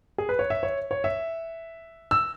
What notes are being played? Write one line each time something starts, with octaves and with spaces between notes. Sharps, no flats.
G#4
B4
C#5
E5
C#5
C#5
E5
E6